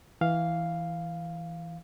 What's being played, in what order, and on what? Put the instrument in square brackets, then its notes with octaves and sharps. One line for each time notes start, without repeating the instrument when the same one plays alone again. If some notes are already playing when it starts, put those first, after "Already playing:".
[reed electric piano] E3 F5